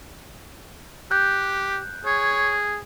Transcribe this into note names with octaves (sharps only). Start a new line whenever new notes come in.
G4 F#6 G6
G#4 C#5